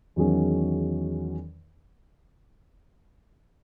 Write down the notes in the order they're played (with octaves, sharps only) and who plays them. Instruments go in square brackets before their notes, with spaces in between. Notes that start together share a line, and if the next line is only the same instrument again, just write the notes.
[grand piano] E2 D#3 F#3 C#4 G#4